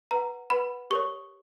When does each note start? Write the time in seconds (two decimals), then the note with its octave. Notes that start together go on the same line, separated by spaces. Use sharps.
0.11 B4 F#5 A#5
0.50 B4 F#5 B5
0.90 G4 A#4 C#5 C#6